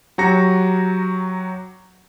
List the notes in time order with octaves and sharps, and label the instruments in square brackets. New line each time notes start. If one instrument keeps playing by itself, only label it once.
[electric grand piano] F#3 F#4 G4 A#5 A#6 C#7